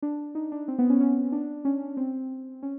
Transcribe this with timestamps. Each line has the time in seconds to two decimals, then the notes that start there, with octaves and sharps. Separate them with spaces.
0.02 D4
0.35 D#4
0.52 D4
0.68 C4
0.79 B3
0.90 C#4
1.01 C#4
1.32 D4
1.65 C#4
1.97 C4
2.63 C#4